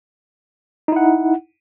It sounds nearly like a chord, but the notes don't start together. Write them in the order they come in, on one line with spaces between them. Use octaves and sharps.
D#4 E4 F#5